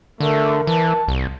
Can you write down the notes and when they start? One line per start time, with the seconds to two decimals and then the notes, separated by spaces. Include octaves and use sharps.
0.20 D3 A3 A#4
0.67 E3 A5
1.08 C2